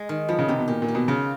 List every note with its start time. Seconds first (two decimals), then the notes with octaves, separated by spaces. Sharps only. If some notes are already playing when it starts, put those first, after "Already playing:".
Already playing: G#3
0.09 D#3
0.29 F3 B3
0.39 C#3
0.48 C3 G4
0.58 B2
0.68 A#2 G4
0.82 A#2
0.88 G4
0.95 B2
1.08 C#3 F4